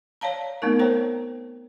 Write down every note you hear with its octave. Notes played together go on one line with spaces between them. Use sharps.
C#5 D5 F5 A5 A#5
A3 B3 C4 D#4 A#4
A#4 C5 C#5 G5 A#5